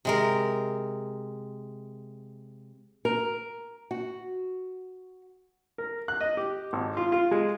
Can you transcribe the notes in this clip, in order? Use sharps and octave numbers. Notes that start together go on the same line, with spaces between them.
C3 G#3 A#4
A#4
F#4
A#4
F#6
D#5
G4
G#1
F4
F4
G#3